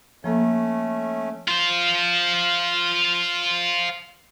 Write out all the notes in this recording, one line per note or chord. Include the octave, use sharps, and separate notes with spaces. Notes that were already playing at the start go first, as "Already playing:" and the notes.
F3 A3 A#3 C#4 A4
F4 C5